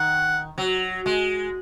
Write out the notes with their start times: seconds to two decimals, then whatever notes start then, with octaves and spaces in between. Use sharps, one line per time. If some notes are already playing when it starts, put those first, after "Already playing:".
Already playing: D#3 F#5
0.58 F#3
1.06 G#3